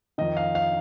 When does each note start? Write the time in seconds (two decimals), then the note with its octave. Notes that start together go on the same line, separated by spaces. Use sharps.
0.18 F2 D#3 D#5
0.37 F5
0.55 F5